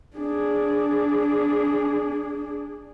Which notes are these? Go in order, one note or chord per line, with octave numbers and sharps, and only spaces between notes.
D4 G#4